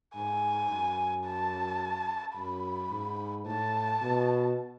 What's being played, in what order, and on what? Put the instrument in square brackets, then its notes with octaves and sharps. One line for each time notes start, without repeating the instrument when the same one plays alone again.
[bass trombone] G#2 [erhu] G#5
[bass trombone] F#2
[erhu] A5
[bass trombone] F#2 [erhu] B5
[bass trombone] G#2
[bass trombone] A2 [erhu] A5
[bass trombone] B2